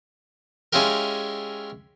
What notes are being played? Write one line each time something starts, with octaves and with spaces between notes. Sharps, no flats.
G#3 C#4 E4 F4 G4 A#4